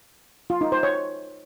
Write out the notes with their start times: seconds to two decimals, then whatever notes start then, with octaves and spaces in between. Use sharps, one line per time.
0.50 F4
0.61 D#4
0.72 C5
0.83 C#5